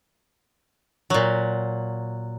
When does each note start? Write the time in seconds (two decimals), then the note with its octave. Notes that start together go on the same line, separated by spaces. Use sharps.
1.10 A#2 F#3